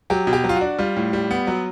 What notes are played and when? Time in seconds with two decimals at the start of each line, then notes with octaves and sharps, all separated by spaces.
0.10 F#3 G4
0.27 B2
0.33 G4
0.44 F#3
0.49 F4
0.56 F#4
0.61 D4
0.78 G3 F4
0.97 A2
1.13 G3
1.31 B3
1.47 F#3